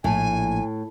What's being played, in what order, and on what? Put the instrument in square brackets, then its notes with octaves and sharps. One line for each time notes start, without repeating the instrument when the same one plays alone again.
[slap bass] A#1 [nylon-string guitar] A2 [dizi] G#5